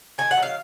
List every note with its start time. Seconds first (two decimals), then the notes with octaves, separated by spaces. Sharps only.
0.18 D#3 G#5
0.31 F#5
0.37 F#3
0.42 F5